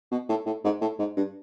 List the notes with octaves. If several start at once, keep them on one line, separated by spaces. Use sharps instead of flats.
B2
A2
A2
G#2
A2
G#2
G2